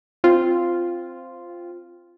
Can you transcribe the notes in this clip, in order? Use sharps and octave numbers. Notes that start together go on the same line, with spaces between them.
C4 F4